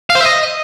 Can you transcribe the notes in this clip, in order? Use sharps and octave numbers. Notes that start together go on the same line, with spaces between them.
F5
C5
E5
D#5